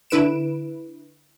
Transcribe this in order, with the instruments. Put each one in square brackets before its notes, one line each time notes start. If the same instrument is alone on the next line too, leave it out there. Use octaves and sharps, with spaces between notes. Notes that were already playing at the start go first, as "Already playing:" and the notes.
[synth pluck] D3 E4 B4 D7 E7